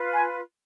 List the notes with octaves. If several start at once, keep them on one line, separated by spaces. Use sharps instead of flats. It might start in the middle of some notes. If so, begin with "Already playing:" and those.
Already playing: F4 B4
G#5